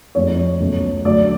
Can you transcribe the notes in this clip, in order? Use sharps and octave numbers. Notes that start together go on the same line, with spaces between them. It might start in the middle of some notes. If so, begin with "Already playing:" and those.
F2 F3 G#3 C#5
C#2 B2 F#3 A3
D2 D3 F#3 D5